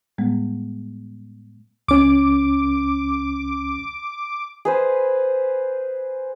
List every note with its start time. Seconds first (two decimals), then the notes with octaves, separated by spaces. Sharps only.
0.18 A2 G3 G#3 B3
1.88 C#2 C#4 D6
4.65 G#4 B4 C5